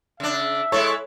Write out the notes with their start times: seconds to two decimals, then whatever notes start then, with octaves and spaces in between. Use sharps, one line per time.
0.20 C#3 D4 E5
0.72 G#3 E4 A4 C#5